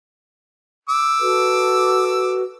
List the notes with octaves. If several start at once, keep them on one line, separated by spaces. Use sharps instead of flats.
D6 E6
F#4 A4 B4